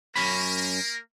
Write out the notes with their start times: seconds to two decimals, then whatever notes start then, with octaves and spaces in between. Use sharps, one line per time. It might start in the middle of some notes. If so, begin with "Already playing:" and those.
0.16 F#2 A#3 C#4 A#4 B5